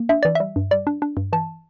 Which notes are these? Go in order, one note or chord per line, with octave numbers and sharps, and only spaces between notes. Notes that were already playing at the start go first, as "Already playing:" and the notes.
Already playing: A#3
D4 E5
E3 D5
G3 E5
G2
G3 D5
D4
D4
G2
E3 A5